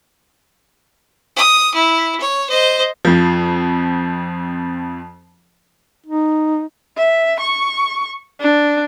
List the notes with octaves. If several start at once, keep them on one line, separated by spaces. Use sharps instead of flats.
D#6
E4
C#5
C5 D#5
F2 F3
D#4
E5
C#6
D4